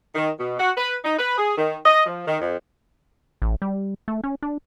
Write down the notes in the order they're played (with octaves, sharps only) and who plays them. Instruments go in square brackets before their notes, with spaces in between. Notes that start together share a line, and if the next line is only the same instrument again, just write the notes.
[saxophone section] D#3
B2
F#4
B4
D#4
B4
G#4
D#3
D#5
F3
D#3
F2
[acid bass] A1
G3
A3
C#4
D4